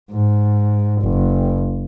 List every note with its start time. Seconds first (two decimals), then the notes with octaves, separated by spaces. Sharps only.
0.11 G#2
1.02 F#1